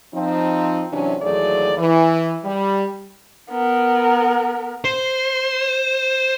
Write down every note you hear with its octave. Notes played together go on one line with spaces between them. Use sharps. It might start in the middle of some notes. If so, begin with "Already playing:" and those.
F3 C4 D#4
C3 E3 F#3 C#4 D4
D#2 E3 F#3 A3 G#4 D5
E3
G3
B3 A#4
C5